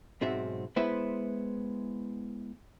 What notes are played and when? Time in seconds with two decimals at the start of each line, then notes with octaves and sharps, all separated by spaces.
0.21 B1 G#2 C4 F#4 E5
0.76 G#3 B3 E4 B4 C5 E5